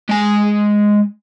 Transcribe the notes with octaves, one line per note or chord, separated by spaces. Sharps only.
G#3 G#5